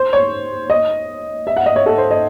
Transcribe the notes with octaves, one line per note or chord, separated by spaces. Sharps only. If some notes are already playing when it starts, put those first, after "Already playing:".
Already playing: C5
C#5
D#5
E5
F#5
D#5
C#5
A4
C5
D#5